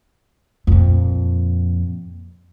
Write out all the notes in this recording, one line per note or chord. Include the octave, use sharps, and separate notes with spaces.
F2 A#2